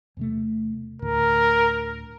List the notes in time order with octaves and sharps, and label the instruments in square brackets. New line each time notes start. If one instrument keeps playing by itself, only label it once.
[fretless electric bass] E2 C3 A3
[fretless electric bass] D2 A2 D3 [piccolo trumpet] A#4